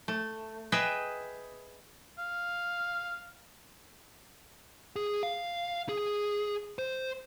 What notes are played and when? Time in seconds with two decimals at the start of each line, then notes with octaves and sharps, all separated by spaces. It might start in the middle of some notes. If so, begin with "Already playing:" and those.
0.08 A3
0.72 G#4 B4 D#5 E5 G5
2.18 F5
4.96 G#4
5.23 F5
5.89 G#4
6.79 C5